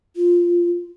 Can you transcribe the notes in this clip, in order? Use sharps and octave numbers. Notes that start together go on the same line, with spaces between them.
F4